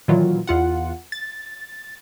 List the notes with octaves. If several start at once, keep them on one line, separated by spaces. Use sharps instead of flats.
A#2 D#3 E3 F#3 F4
E2 F4 F#5
A6